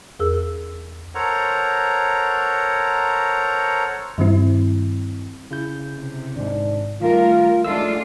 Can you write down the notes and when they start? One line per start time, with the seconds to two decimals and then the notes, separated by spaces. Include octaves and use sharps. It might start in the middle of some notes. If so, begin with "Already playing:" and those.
0.20 E2 G#4 A#4 E6
1.15 A4 A#4 C5 C#5 F#5 A#5
4.18 G2 D#3 G3 C4 E4
5.51 C#3 E4 G6
5.95 C3
6.36 G#1 G#2 D4
7.01 D#3 G3 A3 F4 A#4
7.65 G#3 A3 D4 F4 E6